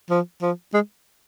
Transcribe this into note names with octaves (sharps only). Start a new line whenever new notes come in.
F3
F3
G#3